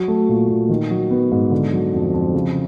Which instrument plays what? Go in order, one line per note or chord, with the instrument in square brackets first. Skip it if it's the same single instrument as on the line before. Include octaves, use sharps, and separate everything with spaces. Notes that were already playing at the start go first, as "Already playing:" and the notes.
Already playing: [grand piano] F#3
A3
A#2
A#2
D#3
F#3
B3
G#2
D3
F#3
F2
F2
C#3